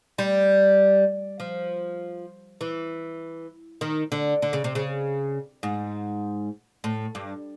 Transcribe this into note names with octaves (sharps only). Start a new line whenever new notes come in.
G3
F3
E3
D#3
D3
D3
C#3
C3
C#3
G#2
A2
G2